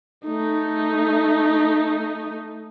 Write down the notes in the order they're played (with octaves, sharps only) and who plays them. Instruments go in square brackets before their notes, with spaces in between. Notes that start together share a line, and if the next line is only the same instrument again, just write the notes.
[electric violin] A3 D#4